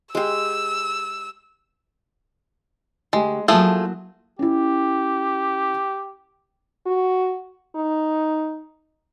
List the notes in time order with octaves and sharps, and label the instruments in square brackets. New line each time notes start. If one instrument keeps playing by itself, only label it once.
[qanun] G#3 G4 [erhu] E6
[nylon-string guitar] D3 A3 G4 [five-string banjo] G#3
[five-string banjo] F3 A3 G#4 [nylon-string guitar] F#3 A#3 E4
[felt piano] C#4 E4 [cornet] G4
[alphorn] F#4
D#4